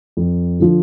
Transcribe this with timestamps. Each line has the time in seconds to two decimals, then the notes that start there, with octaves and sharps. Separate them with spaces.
0.17 F2
0.60 D3 F3